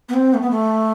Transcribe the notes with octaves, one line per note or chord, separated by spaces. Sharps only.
B3
C4
A3
B3
A3